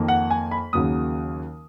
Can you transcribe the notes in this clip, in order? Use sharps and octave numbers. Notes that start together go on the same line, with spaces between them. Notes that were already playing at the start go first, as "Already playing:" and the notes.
Already playing: F2 D#3 A#3
F#5
G#5
B5
D#2 C#3 F#3 A#3 D#6